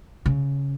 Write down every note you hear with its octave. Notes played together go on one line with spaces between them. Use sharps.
C#3